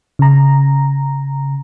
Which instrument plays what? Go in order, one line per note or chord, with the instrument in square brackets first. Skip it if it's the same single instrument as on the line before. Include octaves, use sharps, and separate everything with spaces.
[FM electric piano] C#3 A#5